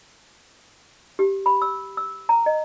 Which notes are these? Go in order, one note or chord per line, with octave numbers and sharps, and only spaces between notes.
G4
B5
E6
E6
A#5
D#5